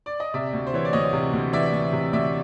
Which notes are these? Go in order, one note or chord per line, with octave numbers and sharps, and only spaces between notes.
D5
D#5
C3 D5 E5
D2
C5
E3 C#5
D5
D2 C#5 D#5
C3
D2
E3 D5 E5
D2
C3
D2 D5 E5